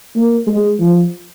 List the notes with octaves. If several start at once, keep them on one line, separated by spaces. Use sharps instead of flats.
A#3
G#3
F3